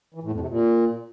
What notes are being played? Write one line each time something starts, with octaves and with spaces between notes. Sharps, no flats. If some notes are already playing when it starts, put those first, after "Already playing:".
E3
A2
F2
C3
A#2